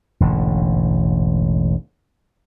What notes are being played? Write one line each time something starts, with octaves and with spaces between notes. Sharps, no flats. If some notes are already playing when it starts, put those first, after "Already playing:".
E1 A1 G#2 D3